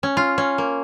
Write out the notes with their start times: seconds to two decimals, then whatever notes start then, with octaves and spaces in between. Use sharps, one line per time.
0.03 C#4
0.17 F4
0.38 C#4
0.58 A#3